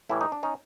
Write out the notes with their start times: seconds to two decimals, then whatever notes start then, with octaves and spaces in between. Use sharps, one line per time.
0.09 A2 E3 G3 E4
0.21 D#4
0.32 D4
0.43 C#4 D#4